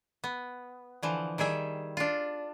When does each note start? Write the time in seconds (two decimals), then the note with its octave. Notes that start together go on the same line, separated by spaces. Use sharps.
0.24 B3
1.03 D3 E3 F3
1.38 D#3 G3 G#4 E5
1.97 D4 F4